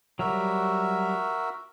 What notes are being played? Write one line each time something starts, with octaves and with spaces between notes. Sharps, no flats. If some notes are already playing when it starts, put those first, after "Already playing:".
F#3 G3 F#4 A#4 E5